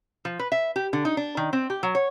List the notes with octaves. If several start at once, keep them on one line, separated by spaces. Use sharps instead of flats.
F3
B4
E5
G4
D3
D#4
D4
D#3
C4
G4
F#3
C#5